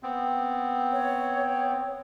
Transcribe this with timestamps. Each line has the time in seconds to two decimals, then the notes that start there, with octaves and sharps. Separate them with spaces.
0.03 B3 C4
0.92 C#5